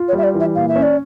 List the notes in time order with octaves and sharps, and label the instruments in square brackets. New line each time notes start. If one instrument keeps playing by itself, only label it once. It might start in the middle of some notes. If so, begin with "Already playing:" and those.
Already playing: [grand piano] F4
[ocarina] C#5
[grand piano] G3
[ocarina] E5
D5
[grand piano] E3
[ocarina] E5
[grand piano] A#2 [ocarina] F5
[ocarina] E5
[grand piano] C#4
[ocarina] D5